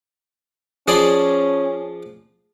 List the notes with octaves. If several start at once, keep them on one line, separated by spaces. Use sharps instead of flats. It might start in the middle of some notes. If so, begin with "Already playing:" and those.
F3 C#4 G#4 D5